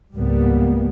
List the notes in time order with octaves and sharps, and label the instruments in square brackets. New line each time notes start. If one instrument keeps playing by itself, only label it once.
[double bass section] C#2 G#2 G3 A#3 B3